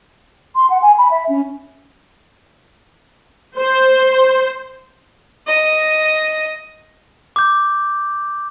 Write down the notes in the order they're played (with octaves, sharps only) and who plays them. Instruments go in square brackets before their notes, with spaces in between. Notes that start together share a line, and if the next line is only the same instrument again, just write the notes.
[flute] C6
F#5
G#5
B5
E5
C#4
[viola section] C5
[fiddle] D#5
[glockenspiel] D6 G6